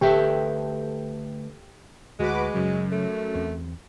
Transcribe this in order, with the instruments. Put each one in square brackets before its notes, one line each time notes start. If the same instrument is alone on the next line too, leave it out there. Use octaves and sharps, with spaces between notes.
[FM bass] D1 [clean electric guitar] D2 B4 E5 [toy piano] G4 [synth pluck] A4 G5
[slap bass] D2 [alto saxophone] G#3 [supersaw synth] F#4 B4 D6
[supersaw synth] F#2 [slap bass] C#3 F#3
[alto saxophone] A3
[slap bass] E2 C4